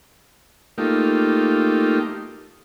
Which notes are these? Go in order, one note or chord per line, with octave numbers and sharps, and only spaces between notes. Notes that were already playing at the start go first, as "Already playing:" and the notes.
A3 A#3 D#4 F4 G4